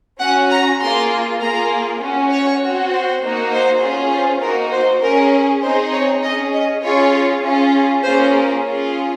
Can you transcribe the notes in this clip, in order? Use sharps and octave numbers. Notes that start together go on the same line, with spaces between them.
C#4 F#4 F#5
A#5
A#3 F4 G#4 C6
A#3 F4 G#4 A#5
C#4 F#4
C#5
C4 F#4
C5
A#3 D#4 F#4
C5
C#4 F4 G#4
C5
A#3 D#4 F#4 A#4
C5
C#4 G#4 A#4
C4 D#4 G#4 C5
C#5
C#4 G#4 D#5
D#5
C#4 F4 G#4 C#5
C#4 F4 G#4
A#3 C#4 F4 G#4 C5
A#4
C#4 F4 G#4